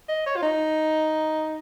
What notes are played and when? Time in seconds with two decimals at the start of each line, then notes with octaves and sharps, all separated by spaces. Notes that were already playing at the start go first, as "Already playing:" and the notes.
0.09 D#5
0.26 C#5
0.36 F4
0.43 D#4